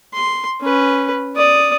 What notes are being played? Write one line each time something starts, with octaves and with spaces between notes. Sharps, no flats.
C6
C#4 B4
D5 D#6